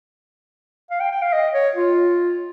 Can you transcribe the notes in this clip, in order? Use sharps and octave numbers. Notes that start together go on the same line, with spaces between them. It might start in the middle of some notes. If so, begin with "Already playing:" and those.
F5
G5
G5
F5
D#5
C#5
F4